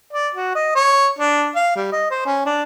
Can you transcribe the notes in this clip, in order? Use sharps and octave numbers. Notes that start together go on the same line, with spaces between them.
D5
F#4
D#5
C#5
D4
F5
G3
D#5
C5
C#4
D4